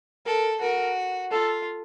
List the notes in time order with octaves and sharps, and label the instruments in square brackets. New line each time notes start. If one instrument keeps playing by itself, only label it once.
[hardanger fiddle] A4 [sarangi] A#4
[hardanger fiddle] F#4 [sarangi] A#4
[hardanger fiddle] F4 [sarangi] A4